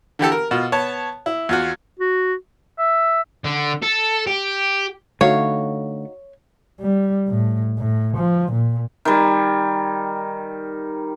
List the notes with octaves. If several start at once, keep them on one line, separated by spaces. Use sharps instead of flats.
D3 E3 G4 A4
A#4
B2 F4
B3 C#5 A5
E4
E2 F4 F#4
F#4
E5
D3
A4
G4
D3 A3 D#4 F#4 C#5 F5
G3
A2
A2
F3
A#2
D#3 G3